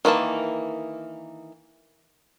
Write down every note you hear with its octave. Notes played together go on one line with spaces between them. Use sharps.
D#3 E3 A#3 A5